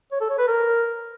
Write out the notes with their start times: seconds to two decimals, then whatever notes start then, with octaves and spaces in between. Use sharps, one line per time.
0.12 C#5
0.21 A4
0.30 C#5
0.39 B4
0.48 A#4